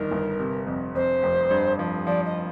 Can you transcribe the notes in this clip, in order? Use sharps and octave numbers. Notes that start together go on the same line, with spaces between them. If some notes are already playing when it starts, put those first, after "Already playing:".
Already playing: G1 F2 D#3 A#4
G1
C3
F2
F2 C5
F1
G2
F3
F3 D5
D#5